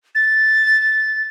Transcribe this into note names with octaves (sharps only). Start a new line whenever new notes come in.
A6